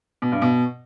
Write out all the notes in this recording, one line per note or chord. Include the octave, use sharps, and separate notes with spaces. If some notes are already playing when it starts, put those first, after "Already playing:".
B2
G2
B2